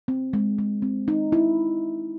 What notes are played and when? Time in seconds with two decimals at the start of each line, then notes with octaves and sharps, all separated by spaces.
0.08 C4
0.33 G#3
0.59 G#3
0.82 C4
1.08 D#4
1.32 E4